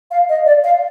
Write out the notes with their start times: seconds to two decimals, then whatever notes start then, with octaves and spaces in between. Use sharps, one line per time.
0.11 F5
0.29 D#5
0.46 D5
0.64 F5